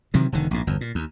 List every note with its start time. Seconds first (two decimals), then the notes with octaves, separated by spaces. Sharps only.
0.14 C3 D#3 E3 F#3
0.32 E1 D3 D#3
0.51 A#1 G#2
0.67 G1 E2
0.81 A#2
0.95 D#2